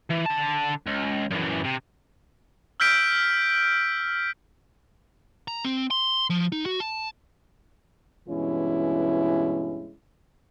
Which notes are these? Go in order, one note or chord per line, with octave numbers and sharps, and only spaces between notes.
E3
D3 A5
C#2
F#2 E3
C3
E6 F6 G6 B6 D7
A#5
C4
C6
F3
D#4
F#4
A5
G2 B2 E3 G#3 C#4 E4